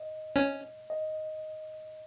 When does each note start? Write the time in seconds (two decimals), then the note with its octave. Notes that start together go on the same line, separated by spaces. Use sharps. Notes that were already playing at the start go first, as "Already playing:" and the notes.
Already playing: D#5
0.36 C#4
0.90 D#5